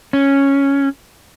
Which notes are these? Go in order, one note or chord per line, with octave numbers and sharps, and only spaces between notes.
C#4